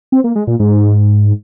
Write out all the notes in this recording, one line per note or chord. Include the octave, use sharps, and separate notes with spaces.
C4
A#3
G#3
A#2
G#2